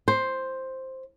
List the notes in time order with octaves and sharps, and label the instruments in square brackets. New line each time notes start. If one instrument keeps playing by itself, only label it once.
[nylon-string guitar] C5